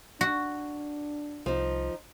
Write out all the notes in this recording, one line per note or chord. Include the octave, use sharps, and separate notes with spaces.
D4 F#4
C2 F3 D#4